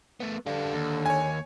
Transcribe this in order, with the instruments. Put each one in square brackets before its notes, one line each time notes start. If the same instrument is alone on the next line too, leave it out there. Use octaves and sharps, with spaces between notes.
[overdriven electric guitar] A3 B3
[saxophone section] D3 [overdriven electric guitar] G3 F5
[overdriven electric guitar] D#2
[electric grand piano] C#5 G#5